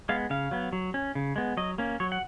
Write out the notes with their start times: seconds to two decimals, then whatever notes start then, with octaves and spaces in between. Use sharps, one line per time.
0.09 G#3 B3 F5
0.30 C#3 F5
0.51 F#3 B3
0.73 F#3
0.94 C#4
1.15 C#3
1.36 G#3 B3
1.57 F#3 D#5
1.78 A#3 C#4
2.00 F#3 C#5
2.12 F#5